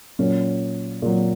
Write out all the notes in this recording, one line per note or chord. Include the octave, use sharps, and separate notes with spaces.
A#2 F#3 C#4
A#2 F#3